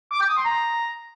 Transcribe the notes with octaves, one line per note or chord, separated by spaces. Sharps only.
D6
G5
D#6
C6
A#5